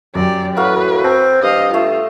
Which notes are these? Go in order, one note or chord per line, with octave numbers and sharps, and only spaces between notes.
F#2 G4 D5 A#5
A2 F#3 F#4 B4 F5
C4 G5 A5
G2 D#5 F5
A3 F4